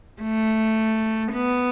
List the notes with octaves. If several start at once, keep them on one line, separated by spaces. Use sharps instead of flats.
A3
B3